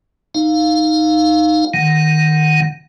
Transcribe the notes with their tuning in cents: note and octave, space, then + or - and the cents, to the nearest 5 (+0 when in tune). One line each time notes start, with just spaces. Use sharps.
D#4 +0 F5 +0
D#3 +0 F#5 +0